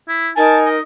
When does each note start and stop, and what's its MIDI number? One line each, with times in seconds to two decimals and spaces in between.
0.08 0.31 64
0.37 0.80 63
0.37 0.78 70
0.37 0.68 80
0.37 0.58 81
0.65 0.80 75